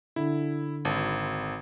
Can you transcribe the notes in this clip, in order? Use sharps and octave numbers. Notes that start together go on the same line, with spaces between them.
D3 E4
G#1